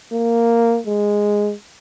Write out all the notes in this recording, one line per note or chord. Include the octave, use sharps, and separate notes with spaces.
A#3
G#3